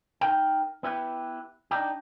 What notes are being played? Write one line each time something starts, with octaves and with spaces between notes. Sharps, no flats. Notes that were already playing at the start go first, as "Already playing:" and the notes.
D#4 A#4 G5
B3 E4 G4 B4
D4 D#4 G4